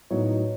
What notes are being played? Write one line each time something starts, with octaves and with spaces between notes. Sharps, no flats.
A2 F#3 B3 D#4 C#5